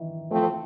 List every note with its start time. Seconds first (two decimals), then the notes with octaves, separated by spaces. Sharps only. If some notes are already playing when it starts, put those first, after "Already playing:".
Already playing: D#3 E3
0.30 F3 A3 C4